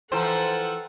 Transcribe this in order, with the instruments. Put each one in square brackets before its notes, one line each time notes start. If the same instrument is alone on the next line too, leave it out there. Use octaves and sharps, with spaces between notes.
[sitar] E3 F3 C5 [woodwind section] A4 [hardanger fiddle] F#5 [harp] G5 A#5